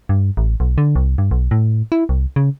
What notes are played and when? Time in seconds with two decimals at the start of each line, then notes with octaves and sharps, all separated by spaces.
0.09 G2
0.37 A1
0.60 B1
0.78 D3
0.96 C2
1.18 G2
1.31 B1
1.51 A2
1.92 E4
2.09 C2
2.36 C#3